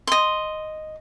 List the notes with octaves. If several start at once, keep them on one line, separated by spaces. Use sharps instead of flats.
D#5 C6